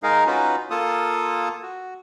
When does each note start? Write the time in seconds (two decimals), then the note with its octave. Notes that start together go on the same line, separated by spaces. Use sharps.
0.03 G#3 D#4 G#4 A#4 F5
0.27 C#4 D#4 F4 F#4 B4
0.70 A#3 F4 A4 D#6
1.62 F#4